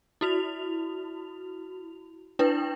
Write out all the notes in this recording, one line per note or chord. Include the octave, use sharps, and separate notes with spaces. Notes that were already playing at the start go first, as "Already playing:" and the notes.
E4 F#4 F7
D4 E4 B4 G5